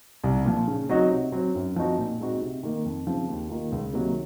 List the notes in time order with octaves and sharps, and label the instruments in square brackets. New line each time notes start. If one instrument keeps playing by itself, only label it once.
[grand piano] C2
A#2 F3
C#3
F#3 C4 D#4 F#4
C3
F#3 C4
F#2
F3 C4 D#4 F#4
A#2
G#3 C4 D#4 F#4
C3
D#3 A#3
F2
C#3 F3 C4 F4
D#2
D#3 A#3 F4
C#2
C3 D#3 F#3 A#3